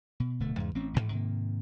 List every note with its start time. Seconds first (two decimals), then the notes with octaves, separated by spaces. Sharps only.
0.20 B2
0.40 D1 B2 D3 A3
0.56 E2 G#2 C#3
0.75 A1 C4 C#4
0.94 A1 D#2 G#2
1.11 G#2 C3 D#3 A#3